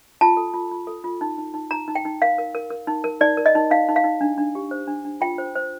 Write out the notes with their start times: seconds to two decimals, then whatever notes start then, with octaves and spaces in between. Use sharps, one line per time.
0.21 F4 A5
0.37 A4
0.54 F4
0.71 F4
0.87 A4
1.04 F4
1.21 D#4
1.38 D#4
1.54 D#4
1.71 D#4 A#5
1.88 D#4
1.95 G5
2.05 D#4
2.22 A#4 F5
2.38 A#4
2.55 A#4
2.71 A#4
2.87 D#4
3.04 A#4
3.21 D#4 D5
3.37 A#4
3.46 D#5
3.55 D#4
3.71 D#4 F5
3.89 D#4
3.96 F5
4.04 D#4
4.21 D4
4.38 D4
4.55 G4
4.71 C5
4.87 D4
5.05 D4
5.21 F4 G5
5.38 C5
5.55 C5